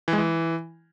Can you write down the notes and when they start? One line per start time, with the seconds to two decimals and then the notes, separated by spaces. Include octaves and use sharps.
0.08 E3
0.13 G#3
0.18 E3